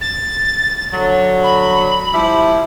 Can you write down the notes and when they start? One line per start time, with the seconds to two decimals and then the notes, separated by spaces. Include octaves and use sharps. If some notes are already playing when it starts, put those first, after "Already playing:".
0.01 A6
0.92 D3 F#3
1.43 B5
2.13 F3 G3 E4